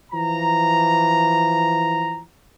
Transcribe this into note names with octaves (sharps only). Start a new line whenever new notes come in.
E3 F3 A#5